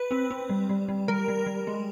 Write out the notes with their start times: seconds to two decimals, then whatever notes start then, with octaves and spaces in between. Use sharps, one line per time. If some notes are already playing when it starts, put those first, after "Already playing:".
Already playing: B4
0.11 C4
0.31 C4
0.49 G3
0.69 G3
0.89 G3
1.08 G3 A#4
1.28 G3
1.47 G3
1.67 G#3